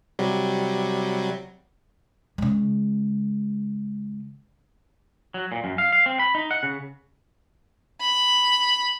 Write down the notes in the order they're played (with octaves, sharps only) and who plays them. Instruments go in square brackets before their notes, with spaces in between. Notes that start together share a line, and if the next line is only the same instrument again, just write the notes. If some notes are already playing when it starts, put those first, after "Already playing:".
[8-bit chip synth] C3 F#3 G3
[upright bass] C#3 G#3
[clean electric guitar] F#3
A#2
F#2
F5
F5
C4
B5
D#4
F#5
C#3
[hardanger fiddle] B5